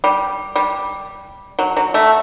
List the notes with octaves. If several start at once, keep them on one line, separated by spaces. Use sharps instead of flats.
G3
G3
F#3
F#3
A3